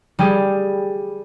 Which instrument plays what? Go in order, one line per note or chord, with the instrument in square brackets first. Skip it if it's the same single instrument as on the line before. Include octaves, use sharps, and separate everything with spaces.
[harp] G3 G4 G#4